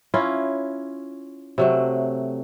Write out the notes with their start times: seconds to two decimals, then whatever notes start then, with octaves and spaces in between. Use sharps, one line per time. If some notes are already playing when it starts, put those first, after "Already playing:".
0.14 C#4 E4 F4
1.58 C3 F#3 A3